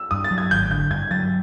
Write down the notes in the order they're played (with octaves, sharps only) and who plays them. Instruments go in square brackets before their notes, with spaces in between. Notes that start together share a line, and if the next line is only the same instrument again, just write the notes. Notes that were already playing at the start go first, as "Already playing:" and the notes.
Already playing: [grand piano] E6
[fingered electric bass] G2 [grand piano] D#6
[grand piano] A6
[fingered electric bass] F#3
[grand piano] G#6
[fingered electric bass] G#1 [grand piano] G6
[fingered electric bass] D3 [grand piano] G6
[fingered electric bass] G2 [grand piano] G#6
[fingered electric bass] F#3 [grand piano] A6